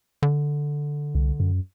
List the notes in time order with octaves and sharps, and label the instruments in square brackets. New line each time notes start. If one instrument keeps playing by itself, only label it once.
[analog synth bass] D3
[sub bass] C2
F#2